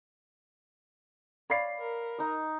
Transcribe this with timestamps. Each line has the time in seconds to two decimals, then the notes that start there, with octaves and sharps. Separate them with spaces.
1.50 C#5 D5 F5 B5 C7
1.79 A#4
2.18 D#4 D#5